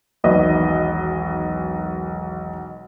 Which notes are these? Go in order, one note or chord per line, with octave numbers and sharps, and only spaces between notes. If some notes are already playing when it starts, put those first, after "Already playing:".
E1 B1 D#3 F#4 B4 D#5